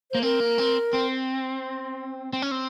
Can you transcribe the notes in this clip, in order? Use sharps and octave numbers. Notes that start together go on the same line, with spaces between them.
A#3 C5
C4 A#4
A#3
C4
C4
C4
C#4
C4